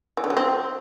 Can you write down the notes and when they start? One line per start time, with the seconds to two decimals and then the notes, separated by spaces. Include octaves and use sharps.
0.17 E3
0.24 D3
0.30 F#3
0.37 C4